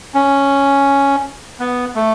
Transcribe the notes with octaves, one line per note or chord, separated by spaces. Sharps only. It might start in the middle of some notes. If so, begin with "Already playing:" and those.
C#4
B3
A3